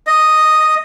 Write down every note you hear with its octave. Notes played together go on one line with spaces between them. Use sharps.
D#5